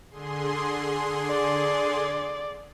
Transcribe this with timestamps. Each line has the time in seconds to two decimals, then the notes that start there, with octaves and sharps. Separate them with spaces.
0.10 D3 G#4 C6
1.27 D5